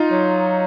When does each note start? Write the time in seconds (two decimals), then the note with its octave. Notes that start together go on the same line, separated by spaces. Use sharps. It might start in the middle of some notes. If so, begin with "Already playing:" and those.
Already playing: D#4 F4
0.12 F#3